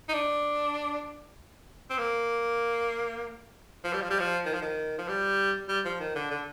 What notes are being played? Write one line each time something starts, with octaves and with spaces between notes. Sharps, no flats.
D#4
D4
C4
A#3
F3
G3
F3
G3
F3
D#3
F3
D#3
F3
G3
G3
F3
D#3
D3
D3